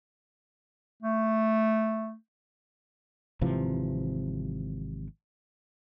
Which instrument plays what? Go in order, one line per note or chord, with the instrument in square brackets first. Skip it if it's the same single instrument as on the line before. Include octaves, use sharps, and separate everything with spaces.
[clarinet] A3
[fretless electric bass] G#1 C3 E3 F3